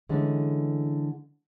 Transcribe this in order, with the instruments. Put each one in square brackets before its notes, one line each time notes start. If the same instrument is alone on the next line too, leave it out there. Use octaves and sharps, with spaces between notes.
[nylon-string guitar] D3 E3 G#3 A3 C#4